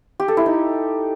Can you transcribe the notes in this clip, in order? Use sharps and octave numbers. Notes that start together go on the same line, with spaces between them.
G4
A4
E4
D#4